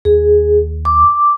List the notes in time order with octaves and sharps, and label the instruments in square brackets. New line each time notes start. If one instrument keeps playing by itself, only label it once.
[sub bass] D#2 [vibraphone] G#4
[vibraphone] D6